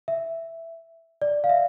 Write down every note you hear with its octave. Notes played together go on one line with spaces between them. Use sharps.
E5
D5
F5
E5